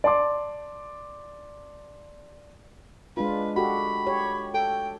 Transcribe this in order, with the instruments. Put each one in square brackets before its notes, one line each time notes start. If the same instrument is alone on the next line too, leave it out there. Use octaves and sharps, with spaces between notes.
[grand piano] D5 A5 C6 D6
[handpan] G#3 D4 F4 [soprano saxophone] B4
[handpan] F#4 G4 A4 [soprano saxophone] B5
[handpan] G4 C#5
[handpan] A4 [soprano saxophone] G5